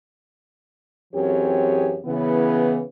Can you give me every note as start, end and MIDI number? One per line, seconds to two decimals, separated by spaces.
1.14 1.99 42
1.14 1.99 52
1.14 1.99 60
1.14 1.99 67
1.14 1.99 68
1.14 1.99 73
2.06 2.81 49
2.06 2.81 52
2.06 2.81 59